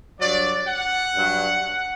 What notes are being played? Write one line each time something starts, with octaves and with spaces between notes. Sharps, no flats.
G2 F#3 D5
F#5
G2 F#3